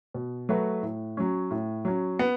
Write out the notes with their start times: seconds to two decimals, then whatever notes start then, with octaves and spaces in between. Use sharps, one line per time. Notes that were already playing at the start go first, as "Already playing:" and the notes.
0.14 B2
0.49 F#3 A3 F#4 B4
0.83 A2
1.17 F#3 C#4
1.51 A2
1.85 F#3 C#4
2.19 B3